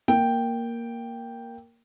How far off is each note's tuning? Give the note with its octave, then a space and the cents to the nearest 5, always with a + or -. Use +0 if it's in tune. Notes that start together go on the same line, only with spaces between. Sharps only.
A#3 +0 G5 +0